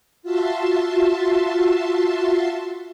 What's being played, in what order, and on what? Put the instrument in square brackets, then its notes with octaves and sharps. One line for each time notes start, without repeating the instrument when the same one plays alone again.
[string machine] F4 F#4 E5 A5 C6